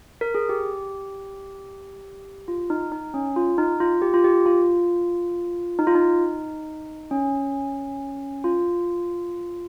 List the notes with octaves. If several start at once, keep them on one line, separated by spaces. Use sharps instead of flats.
A#4
G#4
G4
F4
D#4
D#4
C#4
F4
D#4
F4
G4
F4
G4
F4
D#4
F4
D#4
C#4
F4